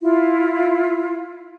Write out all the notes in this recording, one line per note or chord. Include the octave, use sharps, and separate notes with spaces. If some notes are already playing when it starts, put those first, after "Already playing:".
E4 F4